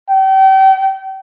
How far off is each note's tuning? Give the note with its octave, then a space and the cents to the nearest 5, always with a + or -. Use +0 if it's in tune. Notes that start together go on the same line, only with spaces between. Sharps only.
G5 -35